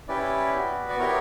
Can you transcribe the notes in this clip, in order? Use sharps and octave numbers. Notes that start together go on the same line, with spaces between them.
C#4 E4 G4 B4 D5
B3 F#4
D5
B3 E4 G4 A#4 C#5